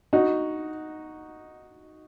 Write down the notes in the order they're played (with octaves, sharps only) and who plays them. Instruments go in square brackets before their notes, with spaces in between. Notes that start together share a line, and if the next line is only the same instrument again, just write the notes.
[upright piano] D#4 F#4